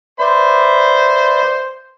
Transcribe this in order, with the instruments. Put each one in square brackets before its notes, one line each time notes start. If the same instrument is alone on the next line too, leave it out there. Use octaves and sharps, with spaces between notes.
[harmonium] B4 D5 E5 [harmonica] C5 C6